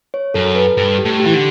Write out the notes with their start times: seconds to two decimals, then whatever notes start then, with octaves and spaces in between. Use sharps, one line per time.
0.14 C#5
0.34 F#2 A4
0.55 B4
0.77 G2 A4
0.98 G4
1.05 A2
1.20 G4
1.25 E3
1.34 D3